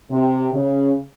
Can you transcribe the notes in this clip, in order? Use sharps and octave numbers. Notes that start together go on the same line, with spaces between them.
C3
C#3